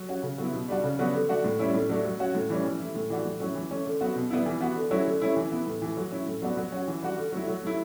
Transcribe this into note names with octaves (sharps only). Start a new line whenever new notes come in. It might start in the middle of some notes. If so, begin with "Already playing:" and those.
Already playing: F#3
C#4 F#4
C#3
F#3 B3 E4
B2
G3 D4 F#4
C#3
F#3 B3 D4 F#4
D3
A3 D4 F#4
A2
G3 C#4 E4
A2
F#3 A3 D4
F#3
C#4 F#4
A2
E3 G3 C#4
E3
A3 E4
A2
E3 A3 D4 F#4
A2
F#3 C#4 E4
E3
A3 C#4
D3
F#3 B3 F#4
B2
G3 B3 E4
E3
B3 F#4
D3
F#3 A3 C#4 E4
D3
A3 C#4 E4
E3
B3 E4
A2
E3 A3
F#3
C#4 E4
A2
F#3 B3 D4 F#4
F#3
C#4 F#4
E3
G3 D4 F#4
D3
F#3 A3 E4
F#3
A3 E4